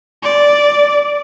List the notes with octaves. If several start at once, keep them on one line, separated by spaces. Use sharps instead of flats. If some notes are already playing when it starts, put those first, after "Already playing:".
D5